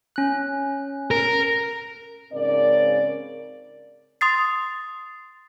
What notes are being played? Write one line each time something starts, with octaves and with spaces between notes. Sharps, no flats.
C#4 F#6
A#4
G#2 C#3 C4 A#4 D5
C6 D#6 A6 C7